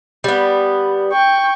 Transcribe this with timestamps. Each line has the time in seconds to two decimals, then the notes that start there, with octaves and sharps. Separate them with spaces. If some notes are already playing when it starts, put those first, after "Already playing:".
0.24 G3 B3
1.12 G5 C#6